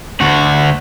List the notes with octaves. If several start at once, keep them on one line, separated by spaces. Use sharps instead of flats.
D2 F#4